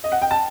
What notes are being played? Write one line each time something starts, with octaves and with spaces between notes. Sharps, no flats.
D#5
F#5
G5
A5